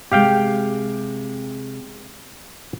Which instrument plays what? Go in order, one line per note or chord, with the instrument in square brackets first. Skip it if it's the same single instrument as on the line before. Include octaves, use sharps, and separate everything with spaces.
[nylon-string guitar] C3 G#3 [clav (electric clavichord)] G4 F5 G5